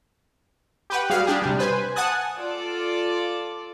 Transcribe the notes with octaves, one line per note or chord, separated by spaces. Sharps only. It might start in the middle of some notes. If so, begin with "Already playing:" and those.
G4 B4 F#5
G3 F#4 G#4 F5
D4 G4 G#4
C3 G3
B4 C5 G#5
F#5 G#5 A5 D#6 F#6 G#6
F4 A4 D5